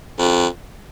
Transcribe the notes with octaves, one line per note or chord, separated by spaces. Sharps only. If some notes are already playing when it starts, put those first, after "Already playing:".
F2